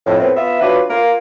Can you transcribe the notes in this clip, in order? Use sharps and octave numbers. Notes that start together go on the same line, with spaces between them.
F2 A2
A2 B3 C4
B3 F4 E5
F#3 D4 F4 B4
A#3 F4 A#4